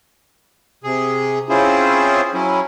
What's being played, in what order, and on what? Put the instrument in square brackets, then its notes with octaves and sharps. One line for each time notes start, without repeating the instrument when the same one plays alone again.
[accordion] C3 G#4
C4 C#4 E4 F4 G#4 C5
F#3 C#4 E4